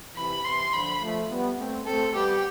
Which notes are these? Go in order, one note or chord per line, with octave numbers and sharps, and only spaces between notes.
C3 E3 B5
C3 E3 C6
D3 F3 B5
F3 A3
G3 B3
A3 C4
A3 C4 A4
G3 B3 G4